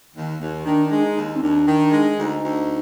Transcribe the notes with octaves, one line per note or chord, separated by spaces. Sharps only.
D#2 D#3
D#2
D#3 D4
D4
G#3
D#4
D#2
D#4
C4
D#2 D4
D#3
G#3
D2 D#4
D2